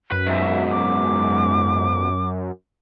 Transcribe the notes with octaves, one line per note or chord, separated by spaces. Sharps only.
F#2 B4
G#2 B2 E5
D6